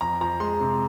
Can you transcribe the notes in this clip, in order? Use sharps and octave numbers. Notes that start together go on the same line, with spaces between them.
F2 A#5
F3 A#5
G#3 C6
C3